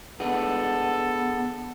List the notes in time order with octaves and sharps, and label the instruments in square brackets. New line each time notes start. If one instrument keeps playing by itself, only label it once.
[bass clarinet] B3 [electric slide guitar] D4 G#4 B4 [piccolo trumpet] A4 [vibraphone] F#5